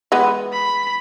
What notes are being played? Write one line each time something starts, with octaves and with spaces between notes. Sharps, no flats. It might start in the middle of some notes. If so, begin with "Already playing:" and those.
E3 G#3 B3
B5